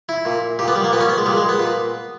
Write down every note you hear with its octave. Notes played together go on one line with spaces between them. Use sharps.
E4
A#2
A#2 G4
B3
G3
A#3
A#2 B3
C#4
B3
G#3
A#2 G3
G#3
B3
A#2